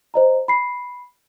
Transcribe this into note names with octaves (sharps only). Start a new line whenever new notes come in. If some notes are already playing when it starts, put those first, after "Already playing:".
C5 D#5 A#5
B5 C7